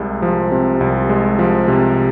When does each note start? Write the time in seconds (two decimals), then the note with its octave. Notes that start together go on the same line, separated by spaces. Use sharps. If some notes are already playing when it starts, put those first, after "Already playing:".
Already playing: C2 C3 G#3
0.22 F3
0.52 C3
0.81 C2
1.09 G#3
1.39 F3
1.68 C3